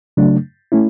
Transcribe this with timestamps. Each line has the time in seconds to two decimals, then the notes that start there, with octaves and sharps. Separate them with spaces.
0.17 C#3 F#3 A3 D4
0.72 A3 C#4 E4